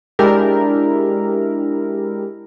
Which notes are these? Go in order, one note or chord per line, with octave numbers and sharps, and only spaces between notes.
G#3 D4 E4 G4 A#4